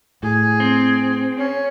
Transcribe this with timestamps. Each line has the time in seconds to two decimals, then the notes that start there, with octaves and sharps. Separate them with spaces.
0.23 A2 G#4
0.60 C4
1.38 C#4